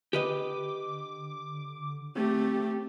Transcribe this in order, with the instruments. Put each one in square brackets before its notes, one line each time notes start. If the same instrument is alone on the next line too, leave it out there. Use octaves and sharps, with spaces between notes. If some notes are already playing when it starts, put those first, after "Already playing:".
[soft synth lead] D3 [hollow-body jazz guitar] G4 B4 D#5 [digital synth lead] D6
[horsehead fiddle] A3 G4 [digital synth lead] C4